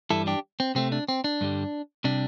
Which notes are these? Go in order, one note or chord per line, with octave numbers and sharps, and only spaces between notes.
G2 E3 G3 E4 A4
D4 G4
C4
C3 A3 C4
D4
C4
D4
G2 D3 G3
C3 G3 D4